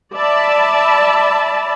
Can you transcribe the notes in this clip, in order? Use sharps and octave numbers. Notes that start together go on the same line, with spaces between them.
D5 E5 A5 B5